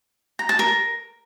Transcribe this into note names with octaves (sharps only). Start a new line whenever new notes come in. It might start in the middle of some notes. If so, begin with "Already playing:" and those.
A#5
A5
A#4